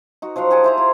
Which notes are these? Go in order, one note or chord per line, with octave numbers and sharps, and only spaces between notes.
D#4 F#4
F3 F#3 F5 F#5
G4 G#4 F#5 A5
E4 C5 A#5
F4